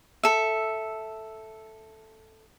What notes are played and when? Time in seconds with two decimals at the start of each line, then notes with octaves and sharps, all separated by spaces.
0.23 A4 E5